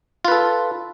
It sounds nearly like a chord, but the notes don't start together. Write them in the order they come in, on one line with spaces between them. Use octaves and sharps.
F4 B4 A4